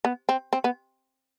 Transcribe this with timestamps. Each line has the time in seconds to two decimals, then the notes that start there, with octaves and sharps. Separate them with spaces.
0.05 B3
0.29 C4
0.53 C4
0.64 B3